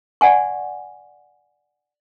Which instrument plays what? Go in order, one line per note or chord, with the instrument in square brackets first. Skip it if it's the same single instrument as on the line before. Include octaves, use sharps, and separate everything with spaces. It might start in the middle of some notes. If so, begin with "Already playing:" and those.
[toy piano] D5 F#5 G#5 C#6